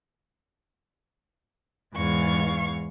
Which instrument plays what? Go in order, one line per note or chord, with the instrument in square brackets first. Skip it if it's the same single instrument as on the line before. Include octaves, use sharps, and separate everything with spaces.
[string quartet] E2 G#2 F5 C#6